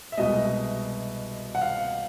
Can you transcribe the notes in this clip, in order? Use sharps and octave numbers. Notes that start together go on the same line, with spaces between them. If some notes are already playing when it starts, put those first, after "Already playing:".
E5
C2 B2 G#3 D#5
F#5
F5